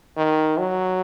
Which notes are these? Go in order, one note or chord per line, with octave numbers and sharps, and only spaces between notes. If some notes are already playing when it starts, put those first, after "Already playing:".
D#3
F#3